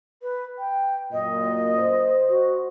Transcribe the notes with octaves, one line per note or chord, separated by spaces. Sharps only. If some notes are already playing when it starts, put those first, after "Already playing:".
B4
G5
F#2 A#2 D#5
C5
F#4